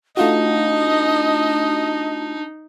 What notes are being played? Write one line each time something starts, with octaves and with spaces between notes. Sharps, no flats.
A3 D4 D#4 F4 F#4 D#5